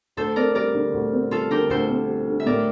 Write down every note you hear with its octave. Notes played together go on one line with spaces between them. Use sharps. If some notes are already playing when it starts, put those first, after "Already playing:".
D2 A4 C5
C4 A#4 D5
G3 A#4 D5
D3
D2
C4
G3 F4 A4
D3 G4 A#4
D2 A4 C5
C4
G3
D3
E5
A2 A#4 D5